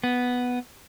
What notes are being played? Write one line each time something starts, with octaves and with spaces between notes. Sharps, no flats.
B3